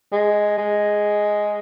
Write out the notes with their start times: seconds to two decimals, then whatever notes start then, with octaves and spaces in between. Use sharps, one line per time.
0.12 G#3
0.58 G#3